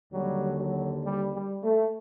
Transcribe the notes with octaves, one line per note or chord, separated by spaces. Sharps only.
D#2 D3 F#3 G3
F#3
G3
G3
A3